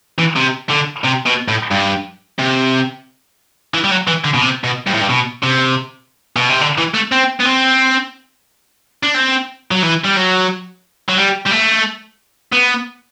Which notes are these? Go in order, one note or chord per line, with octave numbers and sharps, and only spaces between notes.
E3
C3
D3
C3
B2
A2
G2
C3
E3
G3
F#3
E3
D3
B2
C3
B2
G2
A2
G2
B2
C3
B2
C3
D3
E3
A3
C4
B3
C4
D4
C4
F#3
E3
G3
F#3
F#3
G3
G3
A3
B3